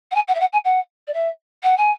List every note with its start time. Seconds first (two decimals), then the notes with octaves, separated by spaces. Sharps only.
0.11 F#5
0.15 G#5
0.28 F#5
0.35 E5
0.40 F#5
0.53 G#5
0.64 F#5
1.07 D5
1.13 E5
1.63 F#5
1.77 G#5